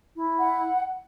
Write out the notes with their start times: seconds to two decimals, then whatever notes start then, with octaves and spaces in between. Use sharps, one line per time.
0.17 E4
0.38 F#5